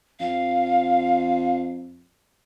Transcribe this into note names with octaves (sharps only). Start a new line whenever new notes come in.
F2 F5